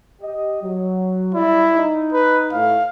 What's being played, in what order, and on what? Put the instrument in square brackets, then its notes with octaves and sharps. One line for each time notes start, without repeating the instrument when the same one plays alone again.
[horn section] G4 D#5
F#3
[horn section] G3 D5 [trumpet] E4
[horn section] D#4
[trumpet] B4
[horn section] A2 [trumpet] F5